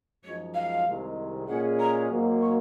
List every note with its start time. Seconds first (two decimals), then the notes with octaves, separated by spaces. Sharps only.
0.23 F#2 F3 G#3 D#4 C#5
0.54 F5
0.86 C2 C3 D#3 G#3
1.47 A#2 G#3 C#4 G#4 F#5
1.79 A#5
2.10 G#1 G#2 F#3 A#3
2.41 C#6